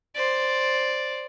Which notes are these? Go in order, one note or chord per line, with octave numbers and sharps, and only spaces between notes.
C5 D5